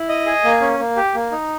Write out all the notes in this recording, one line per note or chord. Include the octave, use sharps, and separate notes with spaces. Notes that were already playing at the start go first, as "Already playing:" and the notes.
Already playing: E4
D#5
G#4
A#3
C#4
A#3
G4
A#3
D#4